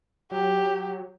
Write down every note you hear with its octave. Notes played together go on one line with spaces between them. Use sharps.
F#3 G4